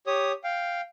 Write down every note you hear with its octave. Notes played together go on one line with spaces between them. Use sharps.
G4 C#5 D#6
F5 G5